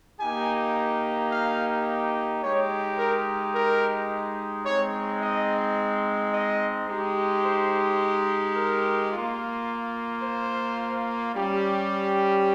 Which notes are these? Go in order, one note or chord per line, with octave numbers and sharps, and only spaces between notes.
A#3 D#4 G4 G#5
F5
G#3 D#4 G4 C#5
A#4
A#4
G#3 C4 D#4 C#5
D#5
D#5
G#3 D#4 G4
C5
A#4
A#3 F4
C5
G3 C#4 G4